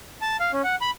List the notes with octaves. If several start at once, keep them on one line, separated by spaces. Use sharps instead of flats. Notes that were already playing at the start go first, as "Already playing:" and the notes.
A5
F5
C#4
F#5
B5